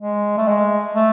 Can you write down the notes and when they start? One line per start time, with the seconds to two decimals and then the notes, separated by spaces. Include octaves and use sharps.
0.01 G#3
0.37 A3
0.48 G#3
0.95 A3